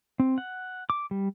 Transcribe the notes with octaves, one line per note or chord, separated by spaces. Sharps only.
C4
F#5
D6
G3